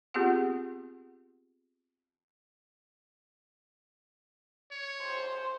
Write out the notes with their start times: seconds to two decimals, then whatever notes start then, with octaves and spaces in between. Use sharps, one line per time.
0.14 B3 C4 F4 G4 G#4 F#5
4.72 C#5
5.02 C5